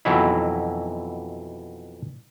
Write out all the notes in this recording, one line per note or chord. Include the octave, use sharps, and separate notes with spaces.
F2 B2 E3 F#3 D#4 E4